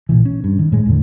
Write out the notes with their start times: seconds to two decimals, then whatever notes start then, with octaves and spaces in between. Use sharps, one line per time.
0.09 A1 A#2 D3 E3
0.25 C#4
0.44 G2
0.59 D#3
0.72 A2 G#3
0.86 E2 A2 D3